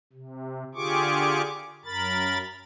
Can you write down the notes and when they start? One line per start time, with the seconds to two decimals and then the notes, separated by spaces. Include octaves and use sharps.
0.13 C3
0.75 D3 F4 G4 G#4 C#6 D6
1.85 F#2 A#4 B5 A6